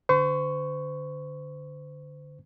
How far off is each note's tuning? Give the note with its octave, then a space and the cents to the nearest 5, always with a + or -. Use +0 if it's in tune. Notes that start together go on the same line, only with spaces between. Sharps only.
D3 +0 C5 -40 C#6 +0